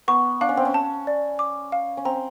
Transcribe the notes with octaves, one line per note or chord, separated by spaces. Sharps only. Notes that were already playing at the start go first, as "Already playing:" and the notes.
B3 C#6
D4 F5
C#4
C4
C#4
A5
D5
D6
F5
C#4
C4 A#5